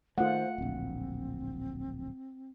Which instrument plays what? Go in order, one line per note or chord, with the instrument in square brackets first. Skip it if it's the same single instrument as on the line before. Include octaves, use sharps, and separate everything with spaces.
[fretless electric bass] D#3 E3 [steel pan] A3 F4 [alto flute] C5 [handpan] F#5
[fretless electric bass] D1 A#1 [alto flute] C4